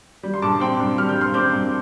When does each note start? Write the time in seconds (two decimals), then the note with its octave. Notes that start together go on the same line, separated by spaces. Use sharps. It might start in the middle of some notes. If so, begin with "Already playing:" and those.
0.23 G3
0.34 C6
0.42 G2 A5 D6
0.60 C4 G5 C6
0.79 G2
0.98 G3 F6
1.09 G6
1.16 G2
1.21 C6 F6
1.34 C4 D6 G6
1.53 G2